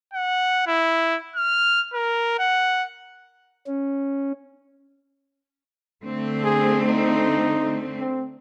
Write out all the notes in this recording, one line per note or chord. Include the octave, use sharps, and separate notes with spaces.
F#5
E4
F6
A#4
F#5
C#4
D3 A3 C4
G#4
D#4
C4